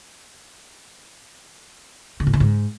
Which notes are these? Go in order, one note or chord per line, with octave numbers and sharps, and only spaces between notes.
D3
A2
D3
G#2